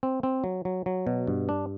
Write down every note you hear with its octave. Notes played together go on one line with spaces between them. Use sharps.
C4
C4
F#3
F#3
F#3
B2
G2
D4